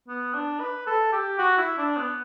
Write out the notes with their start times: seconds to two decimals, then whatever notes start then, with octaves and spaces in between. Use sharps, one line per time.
0.08 B3
0.34 D4
0.60 B4
0.87 A4
1.13 G4
1.39 F#4
1.58 E4
1.78 D4
1.97 B3